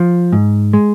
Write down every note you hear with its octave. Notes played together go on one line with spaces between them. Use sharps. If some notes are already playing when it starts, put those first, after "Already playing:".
Already playing: F3
G#2
G#3